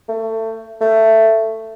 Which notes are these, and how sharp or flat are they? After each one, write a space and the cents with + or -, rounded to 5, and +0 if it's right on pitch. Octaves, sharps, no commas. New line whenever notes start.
A3 +25
A3 +10